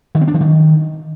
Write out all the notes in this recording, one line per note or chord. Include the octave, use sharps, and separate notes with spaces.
D#3
C4
D4
E3
D#3